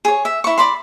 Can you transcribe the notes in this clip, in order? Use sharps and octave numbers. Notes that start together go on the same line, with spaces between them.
G#4 C#5
E5
E4 C#6
D5 B5 C6